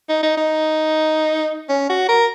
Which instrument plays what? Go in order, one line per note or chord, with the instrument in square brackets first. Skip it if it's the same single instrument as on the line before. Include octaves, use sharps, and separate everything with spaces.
[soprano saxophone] D#4
D#4
D#4
C#4
F#4
A#4